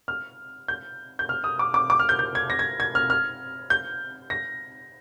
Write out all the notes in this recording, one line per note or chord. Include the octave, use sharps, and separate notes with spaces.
F6
G6
G6
F6
D#6
D6
D6
D6
F6
G6
G6
G#6
A#6
G#6
G#6
F6
F6
G6
A#6